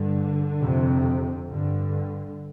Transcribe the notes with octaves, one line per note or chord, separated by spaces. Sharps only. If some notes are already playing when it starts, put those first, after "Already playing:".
Already playing: G2 D3
F2 C3
G2 D3